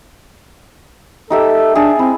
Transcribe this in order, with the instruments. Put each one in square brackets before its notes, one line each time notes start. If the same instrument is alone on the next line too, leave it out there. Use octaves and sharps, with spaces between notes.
[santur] D#4 G4 E5 [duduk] A4
[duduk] D4 [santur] G#4 A5
[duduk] C4 [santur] E4